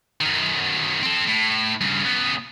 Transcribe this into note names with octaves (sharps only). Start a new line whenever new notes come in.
F#2 D#3
C4 A4
A2
G2 C#3
C#3 B3